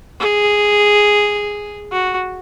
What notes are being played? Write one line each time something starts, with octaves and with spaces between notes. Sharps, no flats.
G#4
F#4